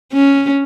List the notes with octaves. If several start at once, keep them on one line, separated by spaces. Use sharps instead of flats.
C#4